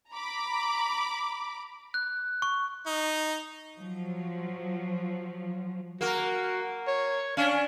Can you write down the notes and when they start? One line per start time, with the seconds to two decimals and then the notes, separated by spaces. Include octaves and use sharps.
0.10 A#5 B5 D6
1.94 F#6
2.42 C#6
2.86 D#4
3.79 F3 F#3
6.01 A#3 F#4 A#4
6.87 C#5
7.37 C#4 D4 F5